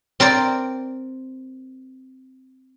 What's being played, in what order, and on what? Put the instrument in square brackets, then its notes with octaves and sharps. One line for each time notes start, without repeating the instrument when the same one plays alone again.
[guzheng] C4 A#4 C5 D5